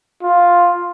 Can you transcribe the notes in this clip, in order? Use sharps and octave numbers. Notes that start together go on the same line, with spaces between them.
F4